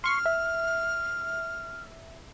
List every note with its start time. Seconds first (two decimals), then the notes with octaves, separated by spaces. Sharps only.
0.04 C6 C#6 F6 C7
0.26 E5